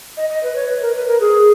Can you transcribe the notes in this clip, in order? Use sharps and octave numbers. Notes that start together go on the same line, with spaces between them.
D#5
D#5
B4
C#5
B4
A#4
B4
A#4
G#4